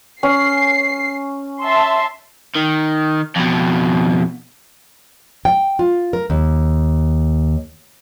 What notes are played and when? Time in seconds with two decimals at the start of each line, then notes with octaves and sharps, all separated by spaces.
0.23 C#4 C7
1.61 E5 A5 C6
2.56 D#3
3.36 F2 B2
5.45 G5
5.79 F4
6.13 A#4
6.30 D#2